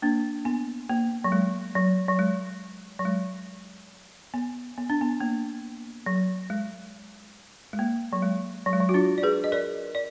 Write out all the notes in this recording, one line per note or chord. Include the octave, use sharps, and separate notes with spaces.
A#3 D4
B3
A#3
F#3
G#3
F#3
F#3
G#3
F#3
G#3
B3
B3
D4
B3
A#3
F#3
G#3
G#3
A#3
F#3
G#3
F#3
G#3
F#3
F#4
D4 F4
D5
G#4 B4
D#5
A#4 D5
D5